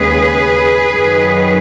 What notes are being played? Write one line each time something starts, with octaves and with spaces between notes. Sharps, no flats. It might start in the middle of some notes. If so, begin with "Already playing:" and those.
Already playing: D#2 C#3 G#3 G#4 B4
F#2 D#3 F#3